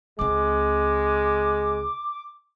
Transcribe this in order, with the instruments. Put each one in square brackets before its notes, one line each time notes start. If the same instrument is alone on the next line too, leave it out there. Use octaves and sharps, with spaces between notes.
[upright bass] C#2 C4 [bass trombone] G#3 [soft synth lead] D6